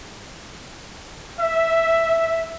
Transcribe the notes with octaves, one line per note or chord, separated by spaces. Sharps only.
E5